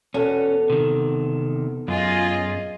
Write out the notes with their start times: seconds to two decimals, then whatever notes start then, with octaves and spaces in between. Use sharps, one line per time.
0.14 E2 B2 C#4 A4
0.70 C3 D#3
1.88 F#2 F4 G#4 D#5